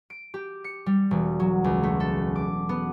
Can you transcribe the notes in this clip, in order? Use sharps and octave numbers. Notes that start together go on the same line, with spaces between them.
D7
G4
C#7
G3
E1
F#3
C#2
A3
A4
D6
B3